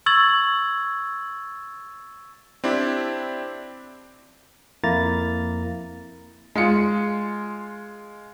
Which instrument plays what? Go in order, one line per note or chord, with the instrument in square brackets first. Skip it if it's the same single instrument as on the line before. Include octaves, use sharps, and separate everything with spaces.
[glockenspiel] C#6 E6 G#6 A6 F#7
[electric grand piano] C4 D4 E4 G4
[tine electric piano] F2 A#3 E4 A#5 A6
[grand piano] G#3 F4 C#7